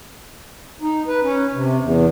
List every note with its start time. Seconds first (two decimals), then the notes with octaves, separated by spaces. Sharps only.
0.82 D#4
1.07 B4
1.23 C#4
1.53 C3
1.81 E2